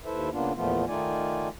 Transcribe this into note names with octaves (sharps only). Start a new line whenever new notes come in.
D#2 E4 A4 B4 C5 E5
C#3 A#3 B3 D4 F4
E2 A#2 F3 A3 B3 F4
D#3 A3 D#4 F4 D5 G#5